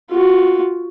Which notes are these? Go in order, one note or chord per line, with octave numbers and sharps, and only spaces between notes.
F4 F#4